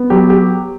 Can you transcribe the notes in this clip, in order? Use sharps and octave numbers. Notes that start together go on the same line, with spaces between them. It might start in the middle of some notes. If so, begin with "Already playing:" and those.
Already playing: B3
F#3 G4
G4